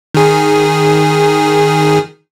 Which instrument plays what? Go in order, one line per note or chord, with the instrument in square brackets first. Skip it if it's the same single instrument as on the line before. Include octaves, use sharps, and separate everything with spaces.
[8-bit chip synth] D#3 G#4